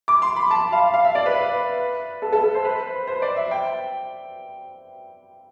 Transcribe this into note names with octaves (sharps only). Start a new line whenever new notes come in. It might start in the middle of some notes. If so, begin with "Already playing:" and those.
D6
C6
B5
A5
F5
F5
E5
D5
B4
A4
A4
A4
C5
B4
C5
C5
D5
E5
G5